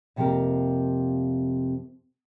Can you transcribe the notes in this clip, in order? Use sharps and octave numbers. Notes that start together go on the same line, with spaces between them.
F2 C3 F3 A#3 G4 A#4